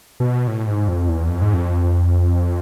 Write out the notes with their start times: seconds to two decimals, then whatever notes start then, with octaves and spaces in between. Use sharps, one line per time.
0.20 B2
0.47 A2
0.67 G#2
0.88 F2
1.09 E2
1.29 F2
1.42 G#2
1.54 F2